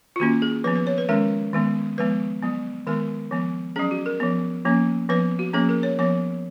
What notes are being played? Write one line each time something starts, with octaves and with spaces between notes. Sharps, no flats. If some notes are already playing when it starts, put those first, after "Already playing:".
F4
D#3 A#3 C#4 F#4
G#4
F3 B3 B4
B4
C#5
B4
D#3 G#3 C#4 A#4
D#3 G#3 B3
F3 G#3 B3 B4
F#3 B3
D#3 G#3 B3 A#4
F3 B3
F#3 C#4 G#4
F#4
A#4
F3 B3
F3 A#3 C#4
F3 B3 B4
F#4
F3 A#3 C#4 G#4
A#4
C#5
F3 B3 C#5